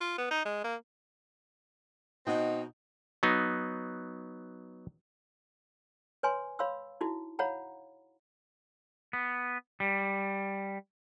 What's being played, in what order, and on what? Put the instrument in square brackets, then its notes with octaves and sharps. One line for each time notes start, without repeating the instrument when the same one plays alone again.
[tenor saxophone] F4
B3
D#4
G#3
A#3
[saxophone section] B2 C4 D#4 [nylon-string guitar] D#5 F#5 G5
[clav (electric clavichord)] F#3 B3 D#4
[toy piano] B4 C#5 G#5 C6
C#5 F5 B5 C6 E6
D#4 E4 F#4
C#5 F5 F#5 A#5 B5
[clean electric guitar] B3
G3